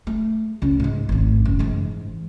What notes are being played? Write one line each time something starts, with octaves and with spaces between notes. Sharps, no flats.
A3
C#2 C#3
G#2 G#3
G#1 A3
F#1
G#2 E3